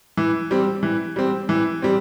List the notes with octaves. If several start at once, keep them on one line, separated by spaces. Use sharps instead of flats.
E3
G3 C4
E3
G3 C4
E3
G3 C4